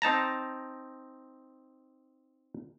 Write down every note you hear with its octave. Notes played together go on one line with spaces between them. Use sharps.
C4 D#4 A5 A#5